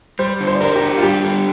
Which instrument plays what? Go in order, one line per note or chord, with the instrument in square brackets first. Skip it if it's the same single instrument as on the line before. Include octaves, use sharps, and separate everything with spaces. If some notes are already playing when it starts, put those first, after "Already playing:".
[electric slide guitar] G3 [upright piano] C5
[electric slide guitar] D3
[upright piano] C5
D5
[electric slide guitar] A#4 [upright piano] C5
[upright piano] G4
[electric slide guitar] D4
[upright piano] F4
[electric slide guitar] G3 [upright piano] G4
[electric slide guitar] D3